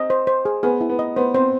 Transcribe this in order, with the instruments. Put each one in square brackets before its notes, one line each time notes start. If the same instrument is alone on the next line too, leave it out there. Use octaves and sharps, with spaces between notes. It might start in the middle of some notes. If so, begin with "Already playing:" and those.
Already playing: [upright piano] C4 [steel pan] D#5
[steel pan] C5
C5
G#4
[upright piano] B3 [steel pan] G#4
[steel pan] E4
[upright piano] B3
[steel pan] D#5
[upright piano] B3 [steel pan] C5
[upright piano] C4 [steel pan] C5